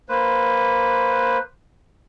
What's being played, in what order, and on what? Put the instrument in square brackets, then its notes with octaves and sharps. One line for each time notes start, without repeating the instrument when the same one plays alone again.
[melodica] A#3 B4 C5